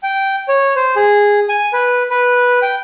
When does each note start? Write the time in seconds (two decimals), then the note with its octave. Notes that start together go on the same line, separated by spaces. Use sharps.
0.03 G5
0.48 C#5
0.76 C5
0.96 G#4
1.49 G#5
1.73 B4
2.10 B4
2.62 G5